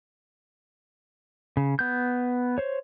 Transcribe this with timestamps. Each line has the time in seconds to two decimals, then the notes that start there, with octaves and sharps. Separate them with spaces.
1.57 C#3
1.79 B3 G6
2.58 C5 C#5